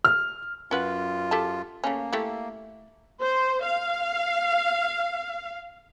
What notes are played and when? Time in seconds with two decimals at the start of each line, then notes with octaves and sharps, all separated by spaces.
0.05 F6
0.71 F#2 C#4 F4 B4 F#5
1.31 G4 A4 A5
1.84 C#3 A3 A#3 C#4
2.13 A3 E4 G4
3.20 C5
3.63 F5